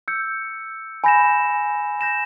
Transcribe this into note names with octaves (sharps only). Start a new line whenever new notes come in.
E6 G6 C#7
G#5 B5 G6 A#6 E7
G6 A#6 E7